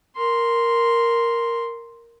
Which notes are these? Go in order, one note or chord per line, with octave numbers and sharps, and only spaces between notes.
A#4 C6